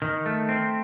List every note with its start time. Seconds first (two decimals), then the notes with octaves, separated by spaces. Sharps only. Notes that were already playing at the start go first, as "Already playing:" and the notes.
0.02 D#3
0.26 A3
0.49 C4